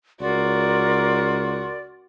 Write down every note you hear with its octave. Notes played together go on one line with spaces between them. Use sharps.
C#2 F#4 A#4 D5 C6